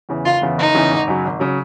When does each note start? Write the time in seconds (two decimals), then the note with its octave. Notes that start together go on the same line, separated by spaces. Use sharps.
0.09 E2 C#3 E3
0.25 F#1 F4
0.42 E2 C#3 E3
0.58 F#1 D#4
0.74 E2 C#3 E3
0.91 G#1
1.08 F#2 C#3 F#3
1.25 G#1
1.40 C#3 F#3